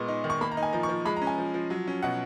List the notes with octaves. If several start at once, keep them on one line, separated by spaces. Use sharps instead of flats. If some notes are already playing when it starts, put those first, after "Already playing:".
Already playing: A#2 G#3 B3 C#6
D#4
D#3
C#6
A#3 B5
A#5
D#4
G#5
F3 A#5
C#6
F3
G#3 B5
A#5
C#4
G#5
F3
F3
F#3
C#4
B2 F#5